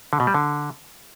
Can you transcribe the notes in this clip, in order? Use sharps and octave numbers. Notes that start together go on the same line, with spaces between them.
D3
B2
G3
D3